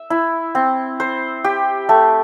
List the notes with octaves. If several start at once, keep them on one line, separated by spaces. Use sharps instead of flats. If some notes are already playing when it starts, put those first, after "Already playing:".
Already playing: E5
E4
C4
C5
G4
A3